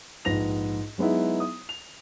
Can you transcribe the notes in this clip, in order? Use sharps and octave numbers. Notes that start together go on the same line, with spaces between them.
A#1 G#2 B4 A#6 F7
F#3 G#3 B3 D#4 E4
D#6
F7